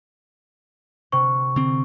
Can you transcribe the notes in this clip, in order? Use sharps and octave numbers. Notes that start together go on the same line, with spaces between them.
C3 C#6
D3 C4